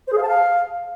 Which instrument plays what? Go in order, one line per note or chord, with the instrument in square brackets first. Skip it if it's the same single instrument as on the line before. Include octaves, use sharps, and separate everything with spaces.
[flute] C5
G#4
F5
A5
F5